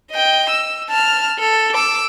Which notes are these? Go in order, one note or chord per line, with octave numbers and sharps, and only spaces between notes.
D#5 G5
E6
A5 F6
A4
D6 E6